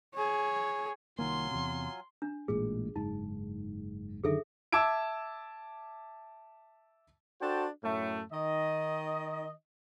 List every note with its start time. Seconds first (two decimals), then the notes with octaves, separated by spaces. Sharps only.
0.15 G#4 C#5
1.19 C2 D#3 F#3 A#3 F4 G#5 C6
1.51 E2 C3
2.22 D4
2.48 A1 A#2 G#3 G#4
2.96 F#1 G#2 D#4
4.24 F#2 D3 D#3 G#4 A4 E5
4.72 E5 A5 D6 E6 G#6 D7
7.41 D4 F#4 A4 C5 G5
7.84 F#2 A2 A3
8.33 D#3 D#5